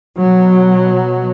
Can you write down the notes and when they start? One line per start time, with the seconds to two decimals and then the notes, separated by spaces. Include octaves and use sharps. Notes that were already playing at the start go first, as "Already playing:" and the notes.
0.19 B2 F#3